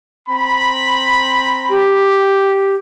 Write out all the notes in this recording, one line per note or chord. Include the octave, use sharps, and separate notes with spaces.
C4 A#5 B5
G4